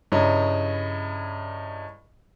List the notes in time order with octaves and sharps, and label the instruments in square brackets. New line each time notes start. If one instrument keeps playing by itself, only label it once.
[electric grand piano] G2 C#3 E4 C#5 D#5 A#5